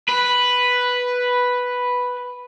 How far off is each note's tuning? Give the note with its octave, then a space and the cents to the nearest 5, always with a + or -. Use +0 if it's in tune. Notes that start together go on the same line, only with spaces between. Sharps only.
B4 +0 B5 +0